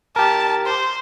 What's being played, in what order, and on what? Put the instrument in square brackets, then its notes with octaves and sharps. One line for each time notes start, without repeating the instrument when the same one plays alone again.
[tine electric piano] G4 A#4 [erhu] A5
[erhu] C5